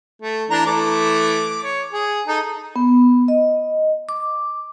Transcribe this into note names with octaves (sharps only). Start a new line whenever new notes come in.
A3
E3 D4 A#5
E3 A3 D6
C#5
G#4
D#4 A4
B3
D#5
D6